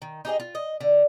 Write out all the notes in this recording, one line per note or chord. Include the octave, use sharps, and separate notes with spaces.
D#3
D#4 G4 G#4 D#5
F4
D#5
D3